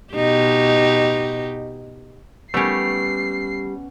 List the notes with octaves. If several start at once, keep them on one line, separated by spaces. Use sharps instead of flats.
B2 D#4 G4
G3 A3 B3 C#4 G4 C7